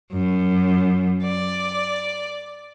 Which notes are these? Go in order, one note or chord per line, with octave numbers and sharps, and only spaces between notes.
F#2
D5